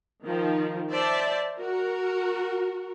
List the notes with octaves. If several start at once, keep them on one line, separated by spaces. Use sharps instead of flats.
D#3 F3
C5 D5 E5 A5
F#4 A#4